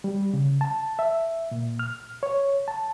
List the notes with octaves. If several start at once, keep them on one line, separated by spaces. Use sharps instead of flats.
G3
C#3
A5
E5
A#2
F6
C#5
A5